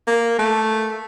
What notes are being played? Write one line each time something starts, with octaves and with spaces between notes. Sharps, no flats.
A#3
A3